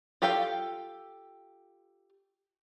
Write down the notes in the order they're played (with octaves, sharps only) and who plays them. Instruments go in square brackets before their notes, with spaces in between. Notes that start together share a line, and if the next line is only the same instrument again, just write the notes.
[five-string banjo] F4 G4 A4 F5 G5